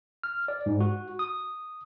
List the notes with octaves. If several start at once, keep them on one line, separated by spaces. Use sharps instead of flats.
F6
D5
G#2
F#4
D#6